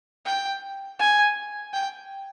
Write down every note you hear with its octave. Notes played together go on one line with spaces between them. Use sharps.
G5
G#5
G5